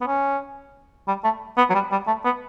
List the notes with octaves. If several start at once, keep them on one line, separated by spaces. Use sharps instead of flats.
B3
C#4
G3
A3
B3
F#3
G3
G3
A3
B3